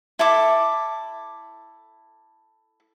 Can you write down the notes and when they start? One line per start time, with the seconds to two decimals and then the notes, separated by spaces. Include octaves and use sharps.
0.19 E4 A4 A5 D6